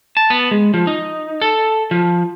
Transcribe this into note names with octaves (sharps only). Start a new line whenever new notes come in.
A5
B3
G#3
F3
D#4
A4
F3